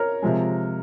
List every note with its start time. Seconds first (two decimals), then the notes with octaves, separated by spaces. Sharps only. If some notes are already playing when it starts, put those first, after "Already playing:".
Already playing: A#4 C#5
0.22 C3 F3 G#3